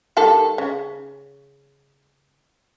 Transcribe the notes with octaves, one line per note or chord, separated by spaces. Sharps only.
D#3 G3 A4
C#3